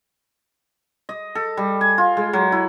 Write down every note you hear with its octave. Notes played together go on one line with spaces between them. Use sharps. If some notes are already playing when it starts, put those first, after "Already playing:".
D#5
A4
G3
G#5
F4
G#3
F#3
E4